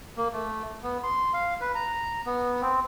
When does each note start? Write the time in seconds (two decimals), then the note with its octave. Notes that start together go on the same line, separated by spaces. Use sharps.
0.17 A#3
0.33 A3
0.83 B3
1.03 C6
1.33 F5
1.61 B4
1.75 A#5
2.26 B3
2.61 C4